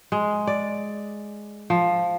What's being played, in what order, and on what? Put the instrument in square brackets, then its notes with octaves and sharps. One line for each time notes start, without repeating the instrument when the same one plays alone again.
[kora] G#3
D5
F3